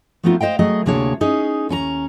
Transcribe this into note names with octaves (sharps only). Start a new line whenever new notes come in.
F3 A3 B3 C4 D#4 F4
C5 D#5 F5 G5
F#3 A3 G#4 D#5
D2 C3 A#3 D4 G#4 C#5
C#4 D#4 G#4
D#2 C#4 G#4 A#5